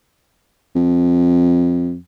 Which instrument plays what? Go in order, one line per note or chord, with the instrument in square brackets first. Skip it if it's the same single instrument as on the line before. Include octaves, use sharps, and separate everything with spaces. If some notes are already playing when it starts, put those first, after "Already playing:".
[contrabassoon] F2